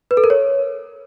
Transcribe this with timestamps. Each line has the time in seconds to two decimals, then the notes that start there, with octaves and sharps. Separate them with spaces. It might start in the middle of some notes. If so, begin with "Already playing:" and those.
0.11 B4
0.17 A4
0.24 A#4
0.30 C#5